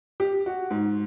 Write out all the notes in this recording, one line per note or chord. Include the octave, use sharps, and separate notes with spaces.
G4
F#4
G#2